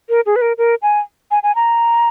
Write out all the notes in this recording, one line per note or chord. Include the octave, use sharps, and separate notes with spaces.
A#4
G#4
B4
A#4
A#4
G#5
G#5
G#5
A#5